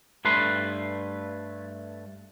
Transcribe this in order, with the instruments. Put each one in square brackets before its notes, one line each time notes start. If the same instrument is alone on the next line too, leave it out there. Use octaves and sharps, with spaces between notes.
[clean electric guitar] G2 A3 B4 C6